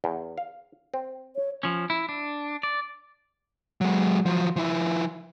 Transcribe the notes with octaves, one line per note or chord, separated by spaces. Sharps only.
E2
F5
C4
C#5
F3 C#4
E4
D4
D5
F#3 G#3
F3 F#3
F3 E4